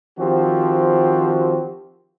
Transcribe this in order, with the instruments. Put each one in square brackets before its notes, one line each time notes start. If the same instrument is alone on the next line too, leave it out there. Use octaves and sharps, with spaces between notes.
[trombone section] D#3 F3 C4 F#4 G4